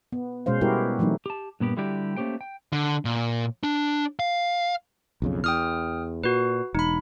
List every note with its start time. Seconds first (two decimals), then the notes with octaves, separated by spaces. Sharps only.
0.12 B3
0.46 B2 G#3 C#4 C5 F5
0.61 G3 B3 E4 F#4 G4 A#4
0.99 E3 F#3 A3 C4 D#4
1.26 G4 A5
1.60 G2 A#2 B3 G4
1.77 D3 G3 E4 F#4 G4 D5
2.17 A3 A#3 C#4 G4 C5 G5
2.41 G5
2.73 D3
3.05 A#2
3.64 D4
4.19 F5
5.22 B1 F2 C#3
5.44 E2 G5 D#6 F6
6.24 A#2 F#4 B4
6.75 E1 D#4 B5